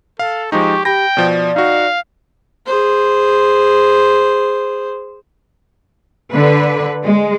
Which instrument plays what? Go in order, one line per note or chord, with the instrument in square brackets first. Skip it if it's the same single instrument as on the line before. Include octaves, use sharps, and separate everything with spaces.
[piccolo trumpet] A4 [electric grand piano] F5
[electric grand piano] F3 G#3 D#4 [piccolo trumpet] G4 [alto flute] C#6
[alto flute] G4 [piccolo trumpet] G5 [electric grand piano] B5 A#6
[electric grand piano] B2 F3 [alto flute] D5
[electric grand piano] D#4 F#4 [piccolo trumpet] F5
[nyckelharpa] G#4 C5
[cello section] D3 B4
G#3